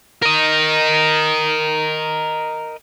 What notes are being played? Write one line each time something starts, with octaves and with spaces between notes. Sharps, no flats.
A#4 D#5